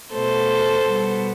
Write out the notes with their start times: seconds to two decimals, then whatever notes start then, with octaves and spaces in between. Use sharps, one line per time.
0.13 B2 A3 A4 C5
0.86 B2 G3 B3